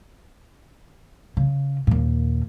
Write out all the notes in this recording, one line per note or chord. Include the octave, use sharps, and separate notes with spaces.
C#3
D#2 A#2